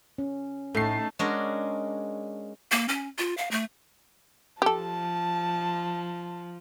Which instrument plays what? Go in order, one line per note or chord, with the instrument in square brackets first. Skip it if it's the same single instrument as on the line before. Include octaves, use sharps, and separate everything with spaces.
[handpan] C#4
[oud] A2 [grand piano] A3 C7 [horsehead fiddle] D#4 A5
[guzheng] G#3 C#4 D4 F#4 A#4
[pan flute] A#3
C#4
F4
F5
A3
[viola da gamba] F3 [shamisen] G4 A4 [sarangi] A5